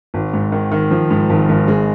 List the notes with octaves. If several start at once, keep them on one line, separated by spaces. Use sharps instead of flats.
G#1
G#2
D#3
D#3
F3
G#2
G#1
G#1
G#3